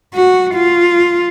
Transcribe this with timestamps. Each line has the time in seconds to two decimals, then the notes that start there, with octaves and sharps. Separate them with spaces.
0.14 F#4
0.55 F4